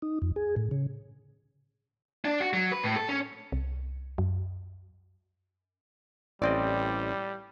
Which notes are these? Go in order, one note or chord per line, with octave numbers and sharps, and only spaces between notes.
D#4
F2
G#4
A2
C#3
D4
F#4
F#3
B4
A2
A4
C#4
C2
F#2
A1 G3 C4 D5 D#5